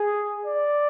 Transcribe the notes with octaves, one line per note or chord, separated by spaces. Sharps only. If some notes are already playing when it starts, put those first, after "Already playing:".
Already playing: G#4
D5